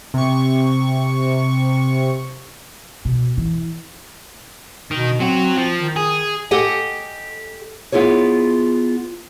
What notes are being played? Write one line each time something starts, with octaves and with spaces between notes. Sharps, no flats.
C3 C#6
B2
E3
B2 D#3
F#3 C4 F#4
F3
D#3
G#4
G4 A4 D#5 F#5 G#5
B3 E4 F4 G#4 C#5